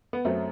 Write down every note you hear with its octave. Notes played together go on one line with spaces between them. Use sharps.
B3
F#2 F#3 A3 C4